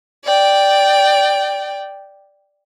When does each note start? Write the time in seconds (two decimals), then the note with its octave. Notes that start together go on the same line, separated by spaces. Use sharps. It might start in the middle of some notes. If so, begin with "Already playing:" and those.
0.25 D5 G5